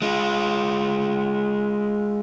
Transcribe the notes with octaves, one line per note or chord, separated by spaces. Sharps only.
G#3 F4